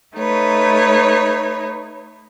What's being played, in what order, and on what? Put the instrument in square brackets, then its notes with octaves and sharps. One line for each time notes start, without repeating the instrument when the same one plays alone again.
[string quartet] A3 D#4 B4 C#5